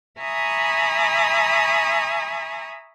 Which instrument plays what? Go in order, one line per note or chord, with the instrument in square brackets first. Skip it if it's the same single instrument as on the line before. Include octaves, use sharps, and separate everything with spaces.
[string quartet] E5 G#5 A#5 B5 C#6 D#6